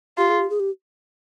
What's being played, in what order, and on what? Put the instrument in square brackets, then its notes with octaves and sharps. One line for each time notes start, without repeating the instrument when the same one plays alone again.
[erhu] F4 [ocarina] G4
[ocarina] G#4
G4
G#4
G4